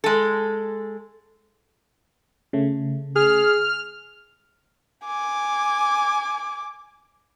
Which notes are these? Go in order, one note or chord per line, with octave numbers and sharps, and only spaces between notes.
G#3 A4
C#3 A3
G#4 F6
G#5 D6